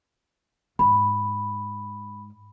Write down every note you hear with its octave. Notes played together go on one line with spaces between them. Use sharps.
G#2 B5